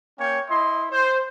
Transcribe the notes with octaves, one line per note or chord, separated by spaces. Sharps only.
A#3 C#4 C#5 G5
E4 D#5 C6
C5